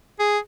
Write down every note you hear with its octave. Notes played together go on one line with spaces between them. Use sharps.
G#4